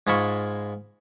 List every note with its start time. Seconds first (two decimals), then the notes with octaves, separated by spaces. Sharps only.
0.07 G#2 G#3 F4 A5 B5 C#6